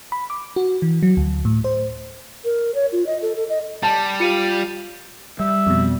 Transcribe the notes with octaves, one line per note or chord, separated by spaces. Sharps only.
B5
D6
F#4
E3
F#3
D2
A2
C5
A#4
C#5
F4
D#5
A4
A4
D#5
G3 A5
F4 G4 F5 C#7 D#7
G3 E5
F2 B2